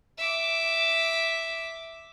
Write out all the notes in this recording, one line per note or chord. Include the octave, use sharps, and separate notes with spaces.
E5 D6